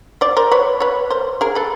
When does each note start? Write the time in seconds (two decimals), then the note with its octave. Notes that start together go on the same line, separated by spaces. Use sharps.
0.21 C5 D5
0.37 A#4 C5
0.52 B4 C#5
0.80 B4 C#5
1.10 A#4 C5
1.41 G#4 A#4
1.55 A4 B4